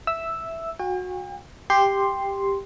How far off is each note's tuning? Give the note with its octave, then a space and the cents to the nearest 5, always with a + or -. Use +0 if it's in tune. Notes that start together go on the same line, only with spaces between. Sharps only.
E5 +0 E6 +0
F#4 -20 G5 +45
G4 +10 C6 +0